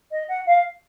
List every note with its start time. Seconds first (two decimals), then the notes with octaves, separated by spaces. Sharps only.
0.11 D#5
0.28 F#5
0.46 F5